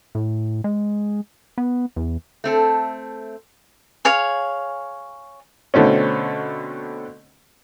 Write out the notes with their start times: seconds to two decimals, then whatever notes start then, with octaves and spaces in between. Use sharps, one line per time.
0.15 A2
0.64 G#3
1.58 B3
1.96 E2
2.44 A3 C4 A4
4.05 G#4 C#5 F5
5.74 B2 D3 A3 C4 C#4